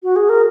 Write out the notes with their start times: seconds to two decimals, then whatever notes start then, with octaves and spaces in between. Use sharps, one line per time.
0.03 F#4
0.16 G#4
0.29 A#4